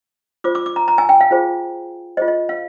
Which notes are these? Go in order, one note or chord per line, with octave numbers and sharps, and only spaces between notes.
F4 C5 D6
D6
D6
A#5
A#5
G#5
G5
F5
F4 G#4 C5
F4 G#4 C5 D#5
D#5
F5